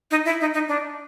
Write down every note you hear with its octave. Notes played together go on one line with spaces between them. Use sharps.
D#4
E4
D#4
D#4
D4